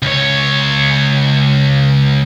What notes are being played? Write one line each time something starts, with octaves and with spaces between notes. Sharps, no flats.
C#2 C#5